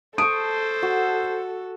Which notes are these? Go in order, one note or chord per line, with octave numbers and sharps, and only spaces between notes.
A4 C5 A5 C#6 D#6 D7
F#4